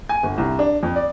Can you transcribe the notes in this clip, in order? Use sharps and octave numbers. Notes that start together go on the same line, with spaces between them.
G#5
G1
C2
D4
F2
D5